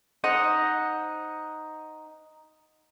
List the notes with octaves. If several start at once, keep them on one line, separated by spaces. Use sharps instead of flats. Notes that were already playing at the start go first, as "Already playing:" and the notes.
D#4 C5 D#5 F#5